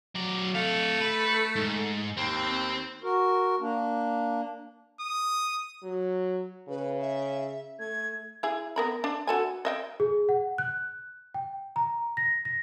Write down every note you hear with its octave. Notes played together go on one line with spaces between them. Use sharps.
F#3 D5
A3 A4 F5
B4
G#2
D#2 C4
F#4 A#4
A#3 D4
D#6
F#3
C#3 B4
E5
A3 G#6
E4 G#4
B3 A#4 B5
D4
F#4 A4 G#5
D#5 E5 G5
G#4
F#5
F#6
G5
A#5
A#6
A#6